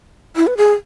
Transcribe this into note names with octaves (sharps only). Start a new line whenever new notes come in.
E4
B4
G#4